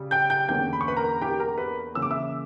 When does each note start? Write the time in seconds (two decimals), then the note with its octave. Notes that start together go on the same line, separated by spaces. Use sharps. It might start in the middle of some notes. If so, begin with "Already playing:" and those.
Already playing: C#3 G3
0.11 G5 G6
0.30 G5 G6
0.48 E2 D3 A#3 C#4 G5 G6
0.73 B5
0.81 C#6
0.88 B4 B5
0.97 A#4 A#5
1.21 G4 G5
1.40 A#4 A#5
1.58 B4 B5
1.94 C#3 E3 A#3 C#4 E6
2.02 D6
2.11 E5 E6